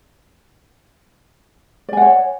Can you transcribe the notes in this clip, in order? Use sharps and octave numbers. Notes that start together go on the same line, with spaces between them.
C#5 D5 F#5 G#5